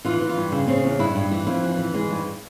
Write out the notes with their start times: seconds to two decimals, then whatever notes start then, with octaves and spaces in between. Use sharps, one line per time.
0.05 E3 F4
0.22 E3
0.29 F4
0.37 G2
0.52 C#3 E4
0.67 C#3 C4
0.77 C#4
0.85 E2
0.99 G2 E4
1.16 G2
1.31 E3
1.47 F2 E4
1.64 E3
1.78 E3
1.94 E3 G#3
2.11 G2